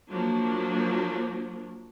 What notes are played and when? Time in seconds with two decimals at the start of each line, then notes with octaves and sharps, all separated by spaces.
0.10 F3 F#3 A#3 D4